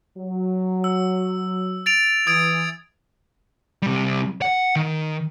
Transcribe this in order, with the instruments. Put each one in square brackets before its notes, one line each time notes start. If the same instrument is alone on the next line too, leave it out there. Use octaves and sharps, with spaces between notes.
[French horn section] F#3
[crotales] E6
A6 D7 F7
[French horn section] E3 [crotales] D#6 G#6 D7
[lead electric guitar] C3 G3
F#5
D#3